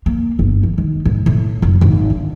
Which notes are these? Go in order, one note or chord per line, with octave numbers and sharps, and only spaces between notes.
A#3
G1
E3
D#3
G#2
A2
F#1
G#1
D3